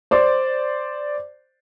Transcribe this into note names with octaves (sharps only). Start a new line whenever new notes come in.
C5 D5 C6 D6